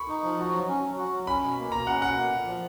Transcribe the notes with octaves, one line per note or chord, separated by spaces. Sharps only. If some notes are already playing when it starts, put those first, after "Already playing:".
Already playing: B5 C#6
D#4
F3
F#4
F#3
C#4
F#3
F#4
F#3
C#4 B5
B2
A#3
B2 A#5
C#4 F#5
B2 F#5
A#3
A#2
F3